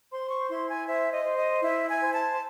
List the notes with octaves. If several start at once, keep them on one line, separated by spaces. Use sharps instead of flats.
C5 C6
C#6
E4 C6
G#5
C5 E5
D#5
C5
D#5
E4 E5
G#5
C5
A5